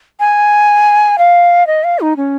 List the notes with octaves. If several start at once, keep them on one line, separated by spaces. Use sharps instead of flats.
G#5
F5
D#5
F5
D#4
C#4